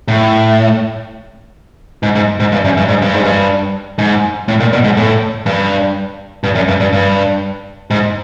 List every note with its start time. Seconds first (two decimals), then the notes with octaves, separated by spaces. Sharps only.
0.08 A2
2.03 G#2
2.15 G#2
2.40 G#2
2.52 G2
2.65 F#2
2.77 G2
2.88 G#2
3.02 G2
3.13 G#2
3.24 G2
3.98 G#2
4.48 A2
4.60 A#2
4.73 B2
4.84 G#2
4.97 A2
5.46 G2
6.44 G2
6.55 F#2
6.68 G2
6.80 G2
6.93 G2
7.91 G#2